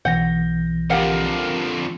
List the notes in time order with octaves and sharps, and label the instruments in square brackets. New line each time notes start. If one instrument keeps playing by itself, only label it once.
[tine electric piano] B1 E3 A#6 [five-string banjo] F#5 [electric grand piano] G6
[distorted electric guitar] F2 D3 [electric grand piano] G4 A#4 F5 [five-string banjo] F#5